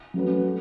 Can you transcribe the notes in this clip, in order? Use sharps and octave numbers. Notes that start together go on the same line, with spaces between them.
F#3 A3 C#4 F#4 B4
A3